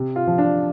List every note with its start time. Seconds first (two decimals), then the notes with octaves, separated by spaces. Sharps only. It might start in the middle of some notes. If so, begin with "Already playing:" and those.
Already playing: C3
0.16 F4
0.27 F3
0.38 D4